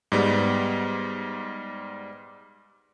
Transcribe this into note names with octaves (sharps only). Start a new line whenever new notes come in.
G#2 G3 B3